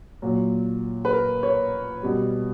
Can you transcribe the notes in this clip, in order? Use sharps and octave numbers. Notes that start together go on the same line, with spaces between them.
A#2 F#3
B4
A#4
C#5
B2 G3